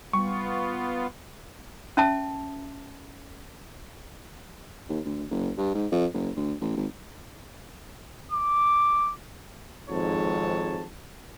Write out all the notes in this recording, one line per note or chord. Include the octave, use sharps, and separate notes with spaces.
G3 B3 F4 C#6
C#4 E5 A5
D#2
D2
F#1
G2
G#2
F2
F#1
D2
A1
G#1
D6
G#1 F2 G#2 C#5 A5